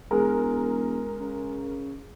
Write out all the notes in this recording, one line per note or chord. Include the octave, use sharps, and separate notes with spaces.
E1 G#3 A#4
C#3